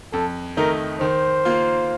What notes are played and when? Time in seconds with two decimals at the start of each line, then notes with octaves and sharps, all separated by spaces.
0.13 F2 A4
0.57 D#3 A3 D#4 A#4
1.01 D#3 C5
1.45 A#3 F4